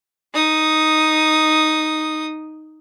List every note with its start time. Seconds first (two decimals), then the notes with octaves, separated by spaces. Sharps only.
0.34 D#4 D#6